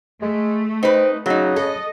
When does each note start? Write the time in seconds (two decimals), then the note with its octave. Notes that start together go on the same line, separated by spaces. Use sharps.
0.22 G#3 A3
0.83 C4 D#4 B4
1.26 C#3 F#3 D#4
1.56 A4 D#5